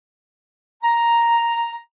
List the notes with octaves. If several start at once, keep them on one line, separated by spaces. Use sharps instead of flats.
A#5